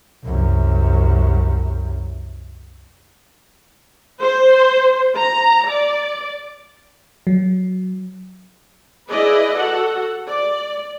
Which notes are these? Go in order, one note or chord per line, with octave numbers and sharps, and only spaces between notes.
C2 F#2
C5
A#5
D5
F#3
E4 G#4 B4 D5 D#5
F#4 A4 F#5
D5